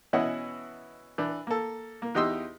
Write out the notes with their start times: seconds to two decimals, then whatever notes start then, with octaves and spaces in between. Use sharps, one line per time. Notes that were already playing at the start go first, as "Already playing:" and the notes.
0.13 B2 E3 C#4 E4 D#5 F#5
1.18 E3 D4
1.47 A#3 A4
2.02 A#3
2.15 E2 D#4 G4 D#5 C6 E6